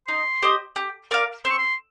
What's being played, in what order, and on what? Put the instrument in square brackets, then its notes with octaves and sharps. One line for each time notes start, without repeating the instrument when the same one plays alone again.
[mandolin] D#4 [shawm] C6
[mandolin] G4 C5 D#5
G4
A#4 D5 F5
[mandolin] C4 [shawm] C6
[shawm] C#6
C6